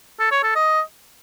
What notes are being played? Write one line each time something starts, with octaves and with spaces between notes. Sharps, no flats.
A4
C#5
A4
D#5